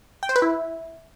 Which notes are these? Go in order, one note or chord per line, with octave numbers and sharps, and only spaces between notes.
G5
C5
B4
E4